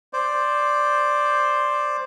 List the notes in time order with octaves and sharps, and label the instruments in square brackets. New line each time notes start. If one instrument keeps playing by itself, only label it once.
[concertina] C5 D5